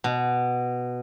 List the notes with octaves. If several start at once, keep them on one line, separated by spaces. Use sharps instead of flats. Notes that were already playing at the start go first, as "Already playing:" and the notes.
B2